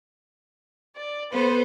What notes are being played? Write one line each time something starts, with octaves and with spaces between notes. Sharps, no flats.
D5
B3 A4 B4 C5